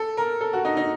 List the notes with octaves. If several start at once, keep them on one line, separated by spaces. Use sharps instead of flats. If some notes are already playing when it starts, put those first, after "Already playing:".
Already playing: A4
A#4
A4
F#4
D#4
D#4